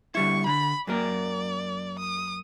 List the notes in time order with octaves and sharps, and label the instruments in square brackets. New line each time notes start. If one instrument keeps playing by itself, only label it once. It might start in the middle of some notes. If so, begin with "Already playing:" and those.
[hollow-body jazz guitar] D3 G3 E4 [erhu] C#6
[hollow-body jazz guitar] D3 [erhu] B5
[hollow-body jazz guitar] F#2 A#3 A#4 [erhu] D5
[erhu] D#6